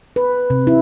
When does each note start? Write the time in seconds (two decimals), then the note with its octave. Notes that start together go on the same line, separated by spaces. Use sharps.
0.16 B4
0.50 C3
0.67 E4